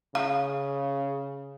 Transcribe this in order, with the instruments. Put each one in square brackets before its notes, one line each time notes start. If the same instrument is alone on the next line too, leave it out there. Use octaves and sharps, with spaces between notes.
[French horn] C#3 [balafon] F5